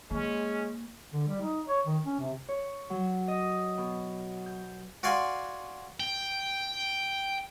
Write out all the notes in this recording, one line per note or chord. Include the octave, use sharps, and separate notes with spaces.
G#3 A#3 C#4
D3
G3
D#4
C#5
D#3
C#4
C3
C#5
F#3
D#5
B2
G6
F#4 D5 F5 G#5 C6
G5